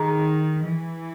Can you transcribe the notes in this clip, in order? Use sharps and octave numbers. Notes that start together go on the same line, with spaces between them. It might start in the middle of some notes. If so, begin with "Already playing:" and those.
Already playing: D#3 G#4 A#5
E3